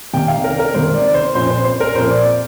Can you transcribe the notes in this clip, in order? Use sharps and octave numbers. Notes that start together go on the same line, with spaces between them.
C3 D#3 A#3 G5
F5
A#4
A#4
C3 D#3 A#3 C5
D5
C5
A#2 F3 C4 C5
C5
C5
A#4
A#2 F3 C4 C5
D5